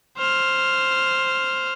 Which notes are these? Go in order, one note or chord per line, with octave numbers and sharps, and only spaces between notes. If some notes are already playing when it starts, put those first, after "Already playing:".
C5 F6